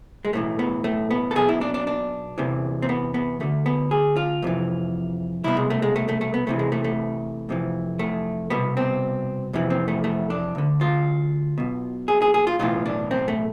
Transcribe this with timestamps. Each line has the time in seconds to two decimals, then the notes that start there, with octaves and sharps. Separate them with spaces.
0.25 G#3
0.33 B1 A2 E3 A3
0.59 B3
0.84 A3
1.11 B3
1.31 A4
1.36 B1 B2 G#4
1.49 E4
1.61 D4
1.74 D4
1.87 D4
2.38 E2 C3 E3
2.82 C4
2.89 B3
3.14 B3
3.40 D2 D3 A3
3.66 B3
3.91 G#4
4.16 F4
4.42 F2 C3 E3
5.44 C2 B2 E4
5.57 G#3
5.70 A3
5.82 G#3
5.96 A3
6.08 A3
6.21 A3
6.34 B3
6.47 E2 C3 E3 A3
6.59 G#3
6.72 A3
6.84 A3
7.49 F2 C3 E3
7.99 A3
8.50 C2 B2 B3
8.77 C4
9.53 F2 C3 E3
9.70 C4
9.88 A3
10.04 A3
10.30 D4
10.55 D2 D3
10.81 F4
11.58 B1 B2
12.08 G#4
12.22 G#4
12.34 G#4
12.47 F4
12.59 B1 A2 E3 F4
12.86 D4
13.11 C4
13.28 A3